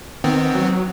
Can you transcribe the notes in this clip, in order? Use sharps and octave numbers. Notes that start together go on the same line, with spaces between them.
D#3 B3 C4
F#3